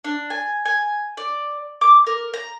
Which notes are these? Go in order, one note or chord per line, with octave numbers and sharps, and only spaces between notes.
D4
G#5
G#5
D5
D6
A#4
A#5